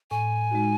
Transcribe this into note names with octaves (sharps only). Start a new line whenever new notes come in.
A2 G#5
G#3 D#4 F#4